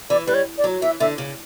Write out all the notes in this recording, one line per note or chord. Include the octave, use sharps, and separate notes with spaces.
E3 D5
G3 B4
C#5
D5
F#3
E3 E5
D3 E5
C#3